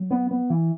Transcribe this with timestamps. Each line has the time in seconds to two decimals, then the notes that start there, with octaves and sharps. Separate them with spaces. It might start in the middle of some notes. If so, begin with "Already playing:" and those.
Already playing: F#3
0.11 B3
0.31 B3
0.50 E3